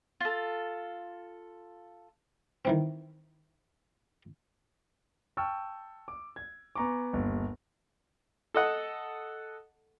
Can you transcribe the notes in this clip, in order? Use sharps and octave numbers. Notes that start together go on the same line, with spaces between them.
F4 A4
D#3 E3 C4
G5 A5 C#6 E6 F6
D6
G#6
B3 G#5 A#5 C#6 D6
G1 D#2
A4 D#5 F#5